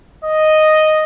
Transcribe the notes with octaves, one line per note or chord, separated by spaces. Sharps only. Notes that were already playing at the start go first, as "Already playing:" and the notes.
D#5